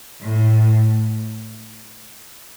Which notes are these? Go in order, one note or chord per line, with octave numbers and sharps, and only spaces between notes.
A2